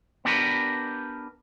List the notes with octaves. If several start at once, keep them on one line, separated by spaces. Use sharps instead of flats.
B3 D4 G4 A#4 B4